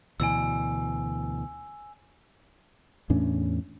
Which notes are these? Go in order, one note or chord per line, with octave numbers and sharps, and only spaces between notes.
D2 B2 E3 G#5 E6
E2 A2 C#4 D4